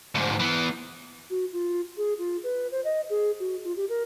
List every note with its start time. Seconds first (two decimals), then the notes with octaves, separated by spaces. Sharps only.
0.15 D2 G#2
0.40 E3 B3
1.30 F#4
1.53 F4
1.97 G#4
2.19 F4
2.44 B4
2.72 C5
2.85 D#5
3.10 G#4
3.40 F#4
3.65 F4
3.76 G4
3.89 A#4